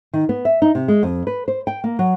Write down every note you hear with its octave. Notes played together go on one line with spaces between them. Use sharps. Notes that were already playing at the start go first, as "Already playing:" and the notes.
D#3
B3
E5
D#4
C3
G#3
F2
B4
C5
G5
A#3
F#3